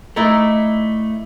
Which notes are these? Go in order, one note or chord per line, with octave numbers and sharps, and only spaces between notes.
A3 D#4 E4 D5